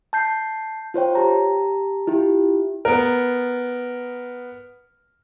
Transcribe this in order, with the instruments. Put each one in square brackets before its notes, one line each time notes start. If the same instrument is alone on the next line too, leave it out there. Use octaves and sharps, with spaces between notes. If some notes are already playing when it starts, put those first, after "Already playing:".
[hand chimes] A5 G6 C7
F4 C5 C#5 G5
G4 A5 A#5
E4 F4 G4
[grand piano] B3 A#4